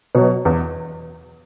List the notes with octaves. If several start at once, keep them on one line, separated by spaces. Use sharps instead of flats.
B2 F#3
E2